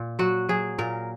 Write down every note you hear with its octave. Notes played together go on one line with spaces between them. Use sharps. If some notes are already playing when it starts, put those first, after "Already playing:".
Already playing: A#2
F#3 F#4
F#3 G#4
A#2 A#4